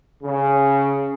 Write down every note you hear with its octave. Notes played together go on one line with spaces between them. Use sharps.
C#3